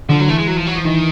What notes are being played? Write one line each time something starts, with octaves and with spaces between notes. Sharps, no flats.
D3 F3
F#3
E3 A3
G#3
F#3
F3
F#3
F3
D#3 E3